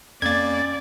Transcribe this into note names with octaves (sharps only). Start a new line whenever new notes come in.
F2 A#3 C#4 D5 G#6 A6